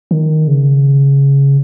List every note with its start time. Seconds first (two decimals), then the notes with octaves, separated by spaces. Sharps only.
0.11 D#3
0.47 C#3